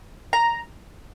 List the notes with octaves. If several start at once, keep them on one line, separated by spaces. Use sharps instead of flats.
A#5